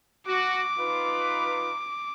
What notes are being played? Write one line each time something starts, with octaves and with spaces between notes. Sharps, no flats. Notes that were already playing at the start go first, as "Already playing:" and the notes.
F#4 D6
D#4 F4 B4